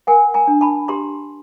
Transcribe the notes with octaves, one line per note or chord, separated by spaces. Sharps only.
A#4 F#5 G#5
G#5 A#5
D4
A5 B5
G4 A#5 C6